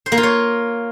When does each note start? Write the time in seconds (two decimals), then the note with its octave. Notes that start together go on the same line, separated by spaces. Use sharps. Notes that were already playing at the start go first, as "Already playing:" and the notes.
0.06 C5
0.12 A#3
0.18 F4
0.23 C#5